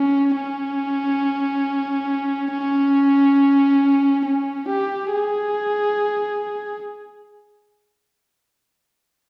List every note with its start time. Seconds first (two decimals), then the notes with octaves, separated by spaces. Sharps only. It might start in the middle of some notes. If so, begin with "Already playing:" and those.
Already playing: C#4
0.36 C#4
2.52 C#4
4.25 C#4
4.68 G4
5.12 G#4